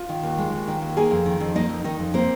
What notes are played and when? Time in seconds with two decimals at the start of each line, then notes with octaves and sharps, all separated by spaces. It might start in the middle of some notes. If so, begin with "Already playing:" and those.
Already playing: F4
0.09 D#3
0.23 D#2
0.38 G#3
0.53 D#2
0.67 D#3
0.82 D#2
0.97 A#3 G#4 G#5
1.11 F2
1.26 D#3
1.40 F2
1.55 A#3 D#4 D#5
1.70 F2
1.84 D#3 D#4 D#5
1.99 F2
2.14 A#3 C4 C5